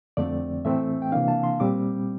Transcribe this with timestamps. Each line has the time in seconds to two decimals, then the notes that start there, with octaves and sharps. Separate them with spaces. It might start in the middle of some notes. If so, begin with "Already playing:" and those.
0.17 F2 D3 F3 A3 C4 D5
0.65 A2 E3 A3 C4 E5
1.02 G5
1.12 C3 E3 A#3 D4 F5
1.28 A5
1.44 C6
1.60 A#2 G3 C4 D6